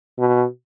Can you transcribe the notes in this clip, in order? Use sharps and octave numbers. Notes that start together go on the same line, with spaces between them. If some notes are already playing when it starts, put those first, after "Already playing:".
B2